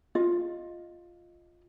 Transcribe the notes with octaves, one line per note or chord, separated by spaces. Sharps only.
F4 D#5